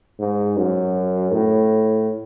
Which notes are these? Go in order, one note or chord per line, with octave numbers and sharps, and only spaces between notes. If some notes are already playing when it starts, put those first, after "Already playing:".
G#2
F#2
A2